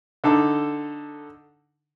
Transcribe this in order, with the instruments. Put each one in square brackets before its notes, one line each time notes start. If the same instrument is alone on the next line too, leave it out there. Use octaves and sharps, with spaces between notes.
[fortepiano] D3 D#4 A4